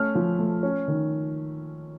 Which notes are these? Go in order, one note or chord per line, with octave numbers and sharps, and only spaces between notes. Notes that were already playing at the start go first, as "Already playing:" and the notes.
Already playing: A3 C#4 F6
F3
A3
C#4
D#3